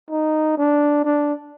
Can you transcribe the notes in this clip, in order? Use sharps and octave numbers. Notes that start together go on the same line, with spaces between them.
D#4
D4
D4